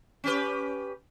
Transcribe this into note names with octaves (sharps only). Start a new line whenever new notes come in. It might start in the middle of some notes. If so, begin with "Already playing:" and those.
C#4 G4 B4